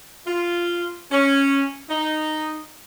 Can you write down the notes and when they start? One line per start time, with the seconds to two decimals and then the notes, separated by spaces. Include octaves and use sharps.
0.27 F4
1.12 C#4
1.90 D#4